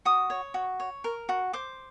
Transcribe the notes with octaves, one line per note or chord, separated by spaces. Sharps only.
F#4 D#6
C#5
F#4
C#5
A#4
F#4
C5 D6